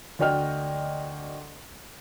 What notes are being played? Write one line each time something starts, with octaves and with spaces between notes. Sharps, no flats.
D2 F#4 D5 D#5 G5 F6